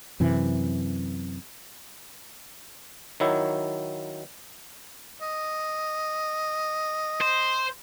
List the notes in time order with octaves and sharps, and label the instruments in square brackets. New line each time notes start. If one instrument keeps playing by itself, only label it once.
[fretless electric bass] F#2 C3 E3
[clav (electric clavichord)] D#3 F#3 E4
[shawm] D#5
[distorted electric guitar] C5